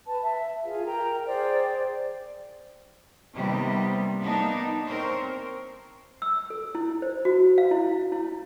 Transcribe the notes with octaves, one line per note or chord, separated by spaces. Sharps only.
B4 A5
E5
F4 G#4 F5
A#4 G5 A#5
G#4 C5 D5 G5
C3 D#3 G3 A#3 B3 G4
A#3 B3 D4 D#4
C4 A#4 C5 C#5
E6
A4
E4
C5
F#4
F5
E4
E4